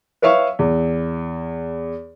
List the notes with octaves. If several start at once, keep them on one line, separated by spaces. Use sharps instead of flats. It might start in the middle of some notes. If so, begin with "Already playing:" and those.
B4 C#5 E5 F5 C#6
E2